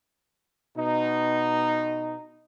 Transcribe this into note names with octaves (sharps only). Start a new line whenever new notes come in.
B2 D#4